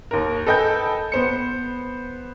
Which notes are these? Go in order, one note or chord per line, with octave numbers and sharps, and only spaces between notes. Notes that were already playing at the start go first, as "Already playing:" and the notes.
D#2 A#4
A4 B4 D#5 G5 G#5 G6
B3 C5 C#7